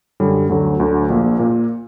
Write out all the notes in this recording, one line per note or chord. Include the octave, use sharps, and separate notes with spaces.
F#2 D3 G3 C#4
D2 D3 F#3
D2 D3 F#3
A#1 A#2 A#3
A#2 A#3